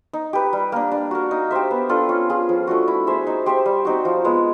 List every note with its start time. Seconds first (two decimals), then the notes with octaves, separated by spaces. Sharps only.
0.13 D#4
0.33 G4 B4
0.53 G3
0.72 A#3 D4
0.91 D4
1.11 F#4 A#4
1.31 D#4
1.51 G4 C5 E5
1.71 B3
1.89 D4 F4 A4
2.09 C#4
2.29 F4 G#4
2.49 F3
2.67 A3 D4 F#4
2.88 E4
3.07 G#4 C5 E5
3.27 D#4
3.46 G4 C5 E5
3.66 G3
3.85 C4 D#4 F#4
4.05 F3
4.24 G#3 B3